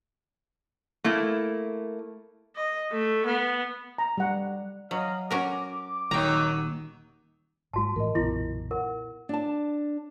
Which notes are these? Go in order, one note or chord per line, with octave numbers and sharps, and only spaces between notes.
A3 A#3 E4
D#5
A3
B3
A#5
G3 F#5
F#3 D#5 F5
C#4 F#4 A#4 D6
D#1 D#2 D#3 F#3 D#4 G5 A#5
G#1 G#3 F#4 A5
A2 E3 A#4 D#5
F#1 B1 A#2 E3 B3 E4 A#6
A#4 F#5
D4 A5